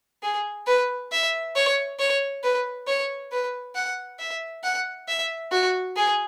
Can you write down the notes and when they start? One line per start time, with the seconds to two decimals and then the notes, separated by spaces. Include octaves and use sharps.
0.23 G#4
0.67 B4
1.12 E5
1.56 C#5
1.99 C#5
2.43 B4
2.88 C#5
3.32 B4
3.75 F#5
4.19 E5
4.64 F#5
5.08 E5
5.52 F#4
5.96 G#4